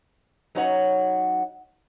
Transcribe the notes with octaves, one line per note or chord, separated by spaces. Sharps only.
F#3 C#4 D#4 F#4 C#5 F#5